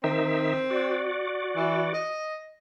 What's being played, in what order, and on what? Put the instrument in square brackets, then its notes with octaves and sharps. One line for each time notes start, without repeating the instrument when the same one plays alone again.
[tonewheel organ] D#3 D#4 E5 [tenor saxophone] C4
[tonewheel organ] F#4 D5
[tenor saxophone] E3
D#5